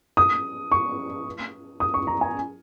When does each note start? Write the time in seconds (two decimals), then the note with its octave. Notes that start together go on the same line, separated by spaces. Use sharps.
0.17 D#6
0.72 C#6
1.80 D#6
1.94 C#6
2.07 A#5
2.21 G#5